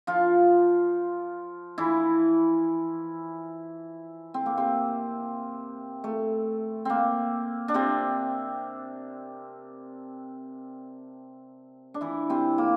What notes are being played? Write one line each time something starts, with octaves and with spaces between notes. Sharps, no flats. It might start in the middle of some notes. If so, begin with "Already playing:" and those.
F3 F4
E3 E4
C4
A#3
C3 C4
A3
A#3 C4
D4
C3 C4
D4
E3 E4
C3 C4
A#3